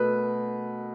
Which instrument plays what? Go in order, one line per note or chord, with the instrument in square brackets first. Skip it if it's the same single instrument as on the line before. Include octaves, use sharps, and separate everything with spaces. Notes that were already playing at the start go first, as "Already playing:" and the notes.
Already playing: [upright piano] B2 A3 B4